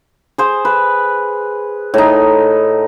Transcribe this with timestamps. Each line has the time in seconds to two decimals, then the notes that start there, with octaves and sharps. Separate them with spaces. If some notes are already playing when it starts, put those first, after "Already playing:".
0.38 G#4 C5
0.65 B4
1.94 A2 D#4